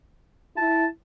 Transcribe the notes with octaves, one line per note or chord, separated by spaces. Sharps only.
E4 A5